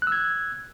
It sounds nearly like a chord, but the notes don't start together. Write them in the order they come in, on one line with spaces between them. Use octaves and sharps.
F#6 E6 G#6